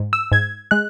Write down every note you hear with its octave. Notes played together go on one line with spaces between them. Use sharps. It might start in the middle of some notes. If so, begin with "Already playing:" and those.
Already playing: G#2
E6
G#2 G#6
G#3 F#6